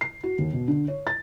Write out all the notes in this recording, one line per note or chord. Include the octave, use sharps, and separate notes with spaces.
C7
F#4
D#2
B2
D3
C#5
A6